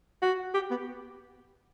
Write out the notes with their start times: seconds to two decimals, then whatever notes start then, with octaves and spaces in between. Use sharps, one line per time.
0.22 F#4
0.54 G4
0.70 B3